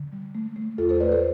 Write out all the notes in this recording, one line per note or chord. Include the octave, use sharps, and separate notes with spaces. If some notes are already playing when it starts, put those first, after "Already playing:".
Already playing: D3
G3
A3
A3
E2 F4 A4
A4 C5
A3 B4 D5
A4 C5